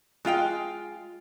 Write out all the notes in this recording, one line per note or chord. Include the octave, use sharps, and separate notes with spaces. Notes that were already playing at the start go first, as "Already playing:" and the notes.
G#3 F4 F5 G5